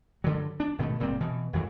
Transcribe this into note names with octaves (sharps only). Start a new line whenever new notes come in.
G2 D3 F#3
D4
G#1 B2 D3 A3
F#1 A#2 G3 C4
B2 E3
G#1 F2 E3 F#3